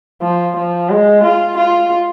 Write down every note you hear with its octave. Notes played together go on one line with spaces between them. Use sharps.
F3
F3
G#3
F4
F4